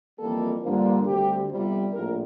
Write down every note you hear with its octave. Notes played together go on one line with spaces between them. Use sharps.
F2 E3 G3 A#3 A4
G2 D3 F3 A#3
D2 D3 G3 C4 G4
G1 F2 C3 G3
A#1 A2 F3 A#4